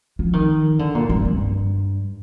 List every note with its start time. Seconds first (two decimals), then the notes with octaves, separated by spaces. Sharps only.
0.19 F3
0.33 D#3
0.79 D3
0.95 A#2
1.09 G2
1.25 G2